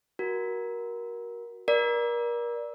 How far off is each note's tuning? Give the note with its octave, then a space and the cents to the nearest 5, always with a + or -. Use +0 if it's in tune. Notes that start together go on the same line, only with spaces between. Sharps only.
F#4 +5 A#4 +20
A#4 +35 D5 +0